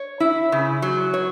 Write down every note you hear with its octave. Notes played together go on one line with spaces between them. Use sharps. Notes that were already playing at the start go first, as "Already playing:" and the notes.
Already playing: C#5
E4
C#3
F#3
C#5